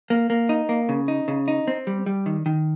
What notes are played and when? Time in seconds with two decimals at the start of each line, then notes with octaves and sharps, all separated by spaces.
0.10 A#3
0.30 A#3
0.49 D#4
0.69 A#3
0.89 C#3
1.08 D#4
1.28 C#3
1.48 D#4
1.68 C4
1.87 G3
2.06 G3
2.26 D#3
2.46 D#3